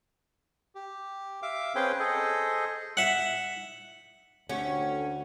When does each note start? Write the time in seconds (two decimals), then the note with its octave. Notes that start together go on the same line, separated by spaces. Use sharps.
0.75 G4
1.42 E5 F5 D6
1.75 C4 C#4 G#4 B4 C5 G5
1.99 G#4 A4 C5 D#5
2.97 E5 F#5
4.49 D2 A3 C#4 F#4 G4